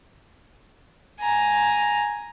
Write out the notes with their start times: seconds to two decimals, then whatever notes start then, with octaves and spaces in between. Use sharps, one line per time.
1.20 G#5 A#5